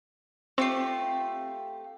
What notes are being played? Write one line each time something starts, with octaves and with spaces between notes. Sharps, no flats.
A3 C4 F4 G4 C7